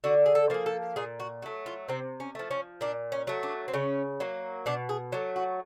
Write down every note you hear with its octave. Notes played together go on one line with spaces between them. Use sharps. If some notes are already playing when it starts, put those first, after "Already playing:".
D3 F#4
G#4
A4
F3 A#3 G#4
A4
A#2 G#4
F#4
F#3 A3
F4
C3 C4
C#4
F3 A3
C#4
A#2 D4
C#4
F#3 A3
D4
C4
C#3 C#4
F#3 A#3
B2 D4
G#4
F#3 A3 G4
F#4